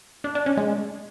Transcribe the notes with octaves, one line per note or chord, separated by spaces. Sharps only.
D4
D4
C#4
G#3